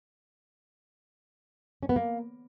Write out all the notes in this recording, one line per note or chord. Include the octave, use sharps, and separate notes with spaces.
C#4
B3
A#3